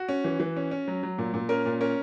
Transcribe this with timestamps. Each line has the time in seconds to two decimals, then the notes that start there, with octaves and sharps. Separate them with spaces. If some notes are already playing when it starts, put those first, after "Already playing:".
Already playing: F#4
0.09 C#4
0.24 E3
0.40 E3
0.56 C#4
0.71 C#4
0.88 F#3
1.03 F#3
1.18 A#2
1.34 A#2
1.49 C#4 A#4
1.65 A#2
1.81 C#4 A#4